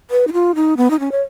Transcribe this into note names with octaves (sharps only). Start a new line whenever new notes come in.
B4
D#4
F4
D#4
B3
D#4
C#4
C#5